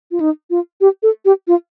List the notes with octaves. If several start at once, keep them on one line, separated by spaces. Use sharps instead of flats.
F4
D#4
F4
G4
A4
G4
F4